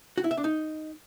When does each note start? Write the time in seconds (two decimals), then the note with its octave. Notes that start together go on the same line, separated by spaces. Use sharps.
0.18 F#4
0.24 E4
0.31 E5
0.37 D4
0.44 D#4